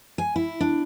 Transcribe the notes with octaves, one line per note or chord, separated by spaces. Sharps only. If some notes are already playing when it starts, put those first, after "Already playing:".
G#5
E4
D4